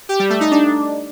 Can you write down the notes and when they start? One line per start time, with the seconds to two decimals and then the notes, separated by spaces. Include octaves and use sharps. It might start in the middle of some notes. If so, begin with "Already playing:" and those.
0.09 G4
0.20 G3
0.30 A3
0.41 D#4
0.51 D4